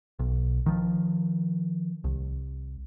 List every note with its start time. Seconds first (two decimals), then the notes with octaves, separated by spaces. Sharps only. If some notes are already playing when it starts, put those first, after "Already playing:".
0.19 B1
0.66 D#3 F3
2.04 C2